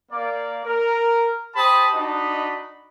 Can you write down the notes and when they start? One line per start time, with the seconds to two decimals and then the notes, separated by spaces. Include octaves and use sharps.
0.12 A#3 D5
0.65 A#4
1.56 G4 C5 A5 B5 D#6
1.94 D4 D#4 F#4 D#5 B5